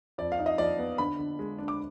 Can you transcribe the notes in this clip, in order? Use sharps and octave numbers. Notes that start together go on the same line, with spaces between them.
F2 D5
F5
D#4
D#5
F3 D5
B3
D3 B5
D3
G#3
D4
D6